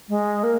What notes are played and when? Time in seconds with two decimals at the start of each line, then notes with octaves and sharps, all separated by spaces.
0.09 G#3
0.43 A#3